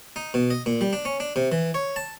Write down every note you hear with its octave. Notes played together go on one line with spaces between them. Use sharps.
D#4
B2
D#5
A#2
G3
D4
C#4
D4
C3
E3
C#5
A5